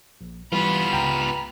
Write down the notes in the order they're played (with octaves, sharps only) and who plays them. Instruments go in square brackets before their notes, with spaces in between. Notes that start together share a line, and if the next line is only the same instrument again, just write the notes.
[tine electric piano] A#1
[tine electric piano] E3 [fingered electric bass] G3 [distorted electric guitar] B3 F4 [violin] B5
[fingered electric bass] C#2 [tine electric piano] G5 A#5